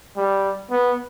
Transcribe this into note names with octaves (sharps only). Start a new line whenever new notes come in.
G3
B3